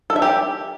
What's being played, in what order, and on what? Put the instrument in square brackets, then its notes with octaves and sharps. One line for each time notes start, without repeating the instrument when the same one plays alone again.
[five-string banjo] A4
E5
G4